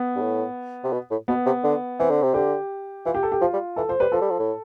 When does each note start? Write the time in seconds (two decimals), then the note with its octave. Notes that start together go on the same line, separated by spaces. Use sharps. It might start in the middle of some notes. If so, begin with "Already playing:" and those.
Already playing: B3
0.16 G2
0.22 A2
0.84 C3
0.93 B2
1.11 A2
1.28 B2 B3
1.46 C3
1.63 D3
1.99 E3 C4
2.10 D3
2.23 C3
2.34 D3 G4
3.06 E3 F4
3.15 G4
3.23 A4
3.32 G4
3.41 F3 F4
3.53 G3
3.76 E3 A4
3.89 F3 C5
4.00 G3 B4
4.12 F3 A4
4.22 G3
4.30 F3
4.39 A2